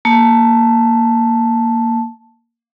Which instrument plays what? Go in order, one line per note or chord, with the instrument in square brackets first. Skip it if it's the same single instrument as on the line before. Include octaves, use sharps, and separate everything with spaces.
[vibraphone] A#3 A5